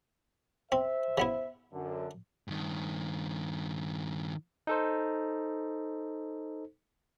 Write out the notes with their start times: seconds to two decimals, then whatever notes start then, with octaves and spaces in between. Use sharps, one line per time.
0.72 C4 C5 E5
1.18 C#3 B3 E4
1.74 F#2 D3
2.48 G2 D#3
4.67 D#4 A4 C5